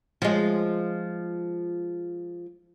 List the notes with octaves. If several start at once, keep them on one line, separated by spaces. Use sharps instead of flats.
F3 G#3